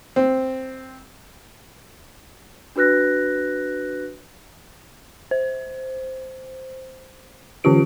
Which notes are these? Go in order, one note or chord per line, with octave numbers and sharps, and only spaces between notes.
C4
D4 F#4 B4 F#6 A#6
C5
D3 E3 C#4 F4 G4 D7